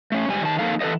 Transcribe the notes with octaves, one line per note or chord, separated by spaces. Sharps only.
A3 C#4
G#2 G3 G#5
D#3 A5
F2 A#3 D#4 A4 F5
E3 A4 B4 C#5 D#5